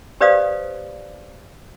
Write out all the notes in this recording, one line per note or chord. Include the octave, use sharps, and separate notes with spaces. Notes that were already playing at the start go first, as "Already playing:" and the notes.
G4 B4 C5 D5 F5 D#6